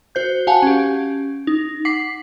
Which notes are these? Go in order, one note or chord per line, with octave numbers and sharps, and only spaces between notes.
F#4 C5 G6
F#4 F5 F#5 G#5 A5
C#4 G4
D#4
F#5 D6 B6 C7